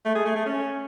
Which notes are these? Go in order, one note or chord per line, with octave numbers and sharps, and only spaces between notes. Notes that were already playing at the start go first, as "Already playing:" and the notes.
A3
G#4
A3
A3
C#4